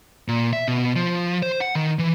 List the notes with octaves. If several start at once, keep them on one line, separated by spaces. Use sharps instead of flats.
A#2
E5
B2
F3
C5
F#5
D#3
E3